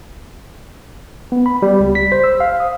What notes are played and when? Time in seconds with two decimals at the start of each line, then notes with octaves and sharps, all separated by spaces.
1.32 B3
1.46 B5
1.62 G3
1.80 C#2
1.95 B6
2.12 C5
2.24 E6
2.40 F5
2.60 D#6